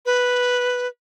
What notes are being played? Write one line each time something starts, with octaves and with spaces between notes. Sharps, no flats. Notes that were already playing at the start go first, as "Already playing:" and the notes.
B4